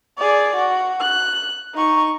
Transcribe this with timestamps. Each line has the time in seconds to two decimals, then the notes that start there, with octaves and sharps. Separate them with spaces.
0.18 G#4 D5
0.56 F#4
1.01 F#6
1.75 D#4 C#6